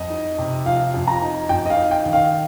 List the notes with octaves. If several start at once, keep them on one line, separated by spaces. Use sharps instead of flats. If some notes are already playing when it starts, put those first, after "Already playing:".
Already playing: F2 D#5
D#4
C3
F3 F5
F2
A#5
D#4
F2 G5
D#5
F5
D#4
G5
D#3
F5